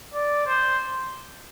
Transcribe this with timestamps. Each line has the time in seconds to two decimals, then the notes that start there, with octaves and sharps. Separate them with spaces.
0.14 D5
0.47 C5